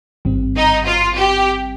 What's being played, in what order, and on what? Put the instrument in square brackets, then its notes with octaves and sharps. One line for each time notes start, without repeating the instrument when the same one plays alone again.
[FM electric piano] G#1 G2 D#3 G3 C4
[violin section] D#4
F4
G4